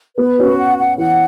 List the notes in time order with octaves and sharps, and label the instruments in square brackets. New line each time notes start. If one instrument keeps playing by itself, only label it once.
[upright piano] B3 [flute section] B4
[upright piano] C#4 [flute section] F#4
[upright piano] B3
[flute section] F#5
F#5
[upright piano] E3 [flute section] F#5